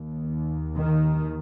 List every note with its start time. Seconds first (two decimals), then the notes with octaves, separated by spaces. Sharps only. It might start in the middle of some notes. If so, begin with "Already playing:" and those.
Already playing: D#2
0.77 D#3